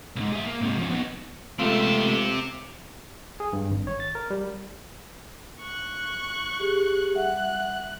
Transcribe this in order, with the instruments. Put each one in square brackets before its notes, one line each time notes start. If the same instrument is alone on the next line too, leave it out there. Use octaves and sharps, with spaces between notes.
[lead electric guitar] C2 G#2
G#4 E5
A#3
G#2 C3
F3 C#4
B3 D#4
[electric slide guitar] G#3 F4 [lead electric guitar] A3 B3 [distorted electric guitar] C4 G4
[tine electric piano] G#4
G2
G#1
C#5
A6
A#4
G3
[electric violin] C#6 F#6
[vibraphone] G4 G#4
[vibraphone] G3 E5 F#5 [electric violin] F#6